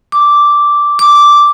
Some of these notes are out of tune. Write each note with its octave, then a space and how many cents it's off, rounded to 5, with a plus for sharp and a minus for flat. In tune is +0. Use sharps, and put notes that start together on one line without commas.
D6 -5
D6 -5